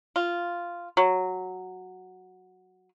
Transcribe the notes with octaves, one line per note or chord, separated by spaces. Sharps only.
F4
F#3